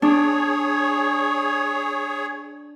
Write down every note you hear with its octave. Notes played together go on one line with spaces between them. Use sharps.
D4 G#4 C#5